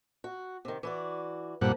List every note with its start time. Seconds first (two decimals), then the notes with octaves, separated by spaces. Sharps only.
0.24 F#4
0.65 C3 D#3
0.83 E3 F#4 D5
1.61 G2 A#2 F3 A#3 F#5